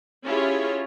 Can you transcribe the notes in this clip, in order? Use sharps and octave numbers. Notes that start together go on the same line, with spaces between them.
C#4 E4 F4 G4 G#4 C#5